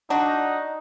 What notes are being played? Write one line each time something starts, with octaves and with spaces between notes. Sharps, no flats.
D4 D#4 F#4